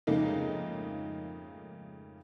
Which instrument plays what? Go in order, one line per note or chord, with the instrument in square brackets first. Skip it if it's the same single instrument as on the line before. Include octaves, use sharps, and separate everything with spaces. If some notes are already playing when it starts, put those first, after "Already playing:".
[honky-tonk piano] F2 G#2 C#3 A3 A#3 D#4